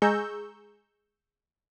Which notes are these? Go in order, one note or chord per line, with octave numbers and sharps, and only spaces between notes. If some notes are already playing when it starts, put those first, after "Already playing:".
G#3 G#4 A#5 C#6 E6 G6